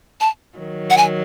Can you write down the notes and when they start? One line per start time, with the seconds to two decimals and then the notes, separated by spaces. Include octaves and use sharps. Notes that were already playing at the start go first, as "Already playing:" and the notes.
0.21 A5
0.58 D#3 F#3
0.90 F#5
0.97 G#5